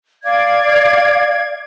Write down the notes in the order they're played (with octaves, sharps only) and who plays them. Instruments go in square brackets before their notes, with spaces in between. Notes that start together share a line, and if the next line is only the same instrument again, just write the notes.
[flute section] D5 F5 G#6